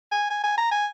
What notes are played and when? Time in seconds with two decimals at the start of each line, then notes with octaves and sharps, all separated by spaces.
0.12 G#5
0.30 G#5
0.44 G#5
0.58 A#5
0.72 G#5